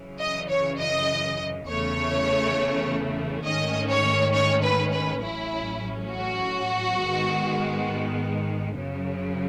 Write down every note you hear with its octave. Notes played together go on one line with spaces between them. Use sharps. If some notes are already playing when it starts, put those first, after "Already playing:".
Already playing: F#2 C#3 E3
D#5
C#5
D#5
E2 C#3 E3 A3 C#5
G#2 D#3 A3 C#4 D#5
C#5
C#5
B4
B4
A1 A2 F#3 C#4 E4
F#4
G#2 D#3 G#3 B3
F#2 C#3 F#3